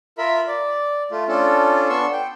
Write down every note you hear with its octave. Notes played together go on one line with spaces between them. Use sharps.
F4 A#4 E5 B5
D5
A3 F4
C#4 D4 F4 A4
B3 D4 C6 C#6 E6
G5